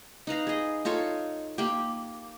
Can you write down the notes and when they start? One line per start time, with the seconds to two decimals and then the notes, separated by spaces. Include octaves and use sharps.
0.27 D#4 B4 F5 A#5
0.47 G#4 D#5
0.85 D#4 F4 A4 C#5
1.58 A#3 G4